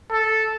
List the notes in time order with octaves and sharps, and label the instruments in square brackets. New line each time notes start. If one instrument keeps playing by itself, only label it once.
[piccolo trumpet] A4